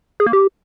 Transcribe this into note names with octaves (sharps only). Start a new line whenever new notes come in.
G#4
A#3
G4